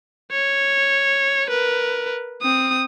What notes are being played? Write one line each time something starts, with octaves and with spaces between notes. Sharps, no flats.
C#5
A#4 B4
C4 D#6